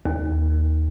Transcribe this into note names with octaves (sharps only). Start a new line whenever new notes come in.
D#2